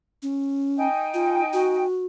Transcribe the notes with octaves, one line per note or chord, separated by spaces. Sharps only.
C#4
D#4 G5 G#5
F4
F#4